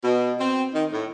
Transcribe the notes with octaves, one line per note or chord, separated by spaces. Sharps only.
B2
C4
D#3
A2